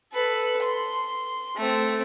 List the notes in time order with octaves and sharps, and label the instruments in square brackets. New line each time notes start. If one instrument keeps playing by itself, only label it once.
[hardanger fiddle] A4 B4
C6
A3 C4